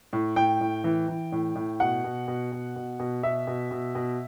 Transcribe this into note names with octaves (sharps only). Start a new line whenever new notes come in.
A2
A2 G5
A2
E3
E3
A2
A2
B2 F#5
B2
B2
B2
B2
B2
B2 E5
B2
B2
B2